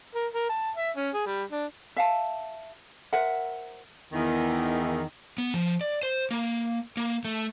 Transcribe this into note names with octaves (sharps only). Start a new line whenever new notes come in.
A#4
A#4
A5
E5
C#4
G#4
G3
D4
E5 F5 A5
A#4 C5 E5 F#5
E2 D#3
B3
F3
D5
C5
A#3
A#3
A3